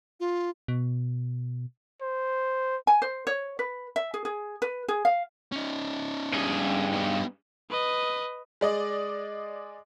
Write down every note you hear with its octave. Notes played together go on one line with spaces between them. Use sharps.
F4
B2
C5
G#5
C5
C#5
B4
E5
G#4
G#4
B4
G#4
F5
C#4 D#4
G2 G#4
B3 D#4
B4 D#5
G#3 D5 D#5